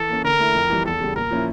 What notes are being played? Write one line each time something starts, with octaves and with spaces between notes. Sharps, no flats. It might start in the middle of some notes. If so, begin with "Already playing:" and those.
Already playing: E3 A4
A#3 C#4
D3 A#4
A3 E4
F2
E3 G3
E2 A4
C#3 G3
A#2 A#4
F3 A#3 C#4 E4